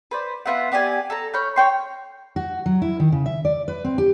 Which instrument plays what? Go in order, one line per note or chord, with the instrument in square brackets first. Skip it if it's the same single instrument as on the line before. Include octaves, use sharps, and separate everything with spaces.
[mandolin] B4 C5 D5
B3 F4 E5 F#5
B3 G4 D5 G#5
A4 A5 A#5
C#5 B5 F6 G6
C#5 G5 C6
[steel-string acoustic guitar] F#4
F#3
E4
D#3
C#3
E5
D5
B4
C4
G4